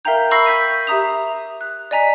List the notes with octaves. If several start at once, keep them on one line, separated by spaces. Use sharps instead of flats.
A#4 E5 F5 G5 A#5 G6
B5 C#6 E6 A#6 C7
G6 B6 D#7
G4 E5 A#5 D#6 F7
F#6
D5 D#5 G#5 A#5 B6